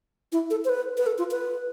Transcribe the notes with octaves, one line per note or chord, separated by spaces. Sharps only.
E4
A4
C5
B4
B4
A4
F4
B4